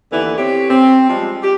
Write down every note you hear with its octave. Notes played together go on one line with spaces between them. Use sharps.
D#2 D3 E3 B3 E4
C4 G4 C#5
C4
F3 G3 G#3
G4